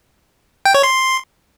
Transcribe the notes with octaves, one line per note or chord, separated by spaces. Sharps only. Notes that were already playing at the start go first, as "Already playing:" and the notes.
G5
C#5
C6